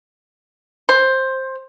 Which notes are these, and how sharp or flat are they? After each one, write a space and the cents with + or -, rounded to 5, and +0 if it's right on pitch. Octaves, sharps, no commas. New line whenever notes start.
C5 +10